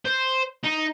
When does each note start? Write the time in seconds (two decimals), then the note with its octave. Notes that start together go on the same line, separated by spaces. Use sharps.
0.05 C5
0.64 D#4